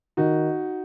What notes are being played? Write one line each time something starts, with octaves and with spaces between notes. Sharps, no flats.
D#3 D#4 F#4